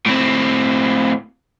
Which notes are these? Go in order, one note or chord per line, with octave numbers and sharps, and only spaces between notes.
A2 C4